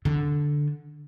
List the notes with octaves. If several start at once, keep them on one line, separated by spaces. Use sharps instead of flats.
D3